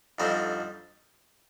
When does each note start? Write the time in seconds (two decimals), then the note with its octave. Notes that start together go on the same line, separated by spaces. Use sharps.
0.19 F2 D3 G3 C4 D#4 C5